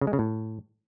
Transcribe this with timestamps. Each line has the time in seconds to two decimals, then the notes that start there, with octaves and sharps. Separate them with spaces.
0.01 C#3
0.07 G#3
0.13 C#3
0.19 A2